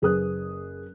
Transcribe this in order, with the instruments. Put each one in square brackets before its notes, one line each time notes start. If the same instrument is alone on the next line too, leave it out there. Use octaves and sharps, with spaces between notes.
[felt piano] F#1 G#4 B4 D#6 F#6